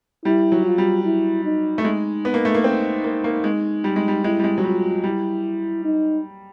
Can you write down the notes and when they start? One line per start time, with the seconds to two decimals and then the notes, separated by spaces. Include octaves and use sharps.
0.25 G3 E4
0.52 F#3
0.65 F4
0.78 G3
1.05 E4
1.44 D#4
1.78 A3
1.84 G#3 D#4
2.25 B3
2.34 A#3
2.45 A3
2.54 A#3
2.64 C4
3.04 A#3
3.24 A#3
3.44 G#3
3.84 G3
3.96 G#3
4.08 G3
4.24 G#3 E4
4.39 G3
4.44 G#3
4.58 F#3
4.64 G3 F4
5.04 G3 E4
5.84 D#4